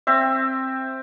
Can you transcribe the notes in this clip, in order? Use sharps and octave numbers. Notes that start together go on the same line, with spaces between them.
C4 E5